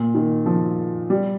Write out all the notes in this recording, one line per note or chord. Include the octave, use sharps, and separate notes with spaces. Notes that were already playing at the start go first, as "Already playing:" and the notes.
Already playing: A#2
D#3
F3
G3